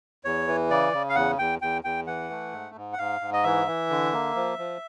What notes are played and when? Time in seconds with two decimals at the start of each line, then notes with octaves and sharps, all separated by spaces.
0.25 E2 C#5
0.47 E3
0.70 C#3 D5
0.93 C#3
1.09 F5
1.15 E2 F#5
1.38 E2 G5
1.62 E2 G5
1.84 E2 G5
2.07 E3 F#5
2.30 A3
2.53 G#2
2.75 G#2
2.93 F#5
2.98 G#2 F5
3.21 G#2
3.33 D#5
3.44 E3 E5
3.67 E3
3.90 D3
4.12 A#3
4.36 F3
4.58 F3